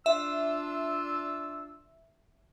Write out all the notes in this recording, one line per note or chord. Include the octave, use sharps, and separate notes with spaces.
D4 F4 E5 E6